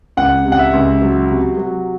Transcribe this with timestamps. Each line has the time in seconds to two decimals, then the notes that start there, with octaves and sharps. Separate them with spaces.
0.17 C#2 F#5
0.45 C3
0.52 F#5
0.59 E5
0.74 C#2
1.02 F#3
1.30 C3
1.57 F#3